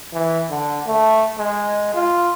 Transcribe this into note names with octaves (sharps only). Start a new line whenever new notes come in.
E3
D3
A3
G#3
F4